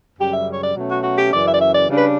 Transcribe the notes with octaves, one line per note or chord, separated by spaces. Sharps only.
F#2 C#3 G3 G4
E5
C#5
D5
B2 F#3 A3 C#4
F#4
F#4
G4
F#2 C#3 E3 D5
E5
D5
E5
D5
C#3 G3 D4
B4